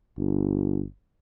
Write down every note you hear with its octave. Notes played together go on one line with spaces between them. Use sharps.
G1